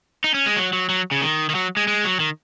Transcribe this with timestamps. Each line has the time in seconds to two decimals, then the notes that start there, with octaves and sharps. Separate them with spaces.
0.24 D#4
0.34 C#4
0.46 G#3
0.56 F#3
0.73 F#3
0.89 F#3
1.11 C#3
1.22 D#3
1.50 D#3
1.55 F#3
1.77 G#3
1.88 G#3
2.05 F#3
2.20 D#3